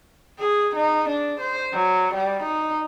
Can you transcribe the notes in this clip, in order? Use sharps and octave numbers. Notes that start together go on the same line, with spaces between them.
G#4
D#4
D4
C5
F#3
G3
D#4